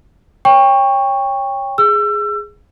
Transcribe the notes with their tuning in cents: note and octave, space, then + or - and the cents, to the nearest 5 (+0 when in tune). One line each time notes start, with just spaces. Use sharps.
C#5 +0 G5 +25 C#6 +0
G#4 +0 E6 +30